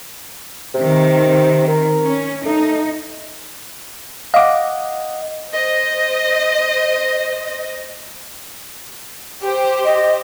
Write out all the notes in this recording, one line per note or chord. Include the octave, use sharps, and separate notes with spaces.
C3 D#3 C4
A#4
C#4
A3 D#4
D#5 F5 F#5 D6
C5 D#5
G4 C5
D#5